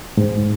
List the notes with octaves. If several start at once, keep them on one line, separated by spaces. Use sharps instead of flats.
G#2